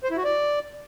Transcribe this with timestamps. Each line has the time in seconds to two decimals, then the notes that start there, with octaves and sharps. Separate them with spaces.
0.03 C5
0.10 E4
0.17 F#4
0.24 D5